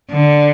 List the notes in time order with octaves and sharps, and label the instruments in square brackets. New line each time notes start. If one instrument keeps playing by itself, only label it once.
[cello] D3